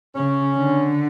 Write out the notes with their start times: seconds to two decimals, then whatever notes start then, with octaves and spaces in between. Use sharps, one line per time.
0.15 C#3 C#4
0.57 D3